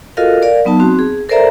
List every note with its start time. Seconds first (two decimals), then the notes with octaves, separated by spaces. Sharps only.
0.17 F4 F#4 A4 A#4 D#5 F5
0.42 A#4 D5 F5
0.65 F#3 B3 D#4 A5
0.80 C4 F#4
0.99 G#4
1.29 A4 A#4 C5 D5 E5 A#5